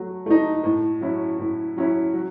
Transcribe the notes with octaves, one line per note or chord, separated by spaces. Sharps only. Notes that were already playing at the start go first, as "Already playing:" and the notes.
Already playing: F#3 A3
A3 D#4
A2
F#3 C#4 E4
A2
F#3 C#4 E4
F#3